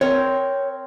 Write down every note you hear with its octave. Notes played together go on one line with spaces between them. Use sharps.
C4 A#4 C#5